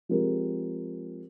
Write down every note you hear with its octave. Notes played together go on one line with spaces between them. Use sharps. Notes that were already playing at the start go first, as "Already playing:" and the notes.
F3 G#3 C4 G4 A#4